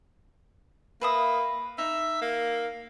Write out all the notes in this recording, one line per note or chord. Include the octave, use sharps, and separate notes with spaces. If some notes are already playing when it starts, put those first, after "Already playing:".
A#3 B4 E5 D#6
D#4 E5
A#3